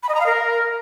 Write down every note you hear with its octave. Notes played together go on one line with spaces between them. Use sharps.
B5
D#5
A#5
F5
A#4